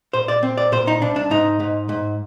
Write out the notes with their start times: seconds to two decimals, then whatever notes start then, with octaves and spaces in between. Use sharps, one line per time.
0.13 A#2 C5
0.28 D5
0.43 C4
0.58 D5
0.72 A#2 C5
0.87 D#4
1.01 C2 D4
1.16 D4
1.31 G#2 D#4
1.60 G#2
1.89 G#2